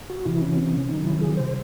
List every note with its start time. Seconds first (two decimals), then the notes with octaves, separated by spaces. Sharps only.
0.10 F#4
0.25 C3 E3 E4
0.41 C#4
0.57 C4
0.73 C#4
0.89 C3 D#3 F#3 D#4
1.05 E4
1.21 G#4
1.37 C5